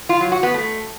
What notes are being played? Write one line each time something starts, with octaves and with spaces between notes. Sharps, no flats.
F4
F#3
F#4
B3
A3